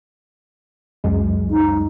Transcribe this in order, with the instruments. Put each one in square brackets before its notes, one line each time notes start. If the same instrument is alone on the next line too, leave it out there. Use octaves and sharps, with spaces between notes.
[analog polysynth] C#2 F#2 G#3
[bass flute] D#4